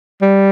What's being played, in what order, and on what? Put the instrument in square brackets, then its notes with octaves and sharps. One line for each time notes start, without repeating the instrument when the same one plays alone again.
[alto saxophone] G3